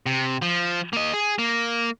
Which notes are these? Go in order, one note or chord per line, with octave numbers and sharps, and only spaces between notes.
C3
F3
A#3 D#5
G#4
A#3